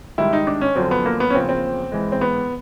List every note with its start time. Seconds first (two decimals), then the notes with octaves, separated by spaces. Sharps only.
0.18 G#2 D#3 G3 E4
0.33 D#4
0.47 D4
0.61 C#4
0.75 F#2 D3 F3 C4
0.91 B3
1.05 A#3
1.20 B3
1.30 C#4
1.34 E2 C#3 F3 A#3 C4
1.49 C4
1.92 G#2 E3 G#3
2.12 C4
2.21 B3